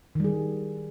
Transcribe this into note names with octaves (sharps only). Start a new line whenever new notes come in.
D#3 G3 G#4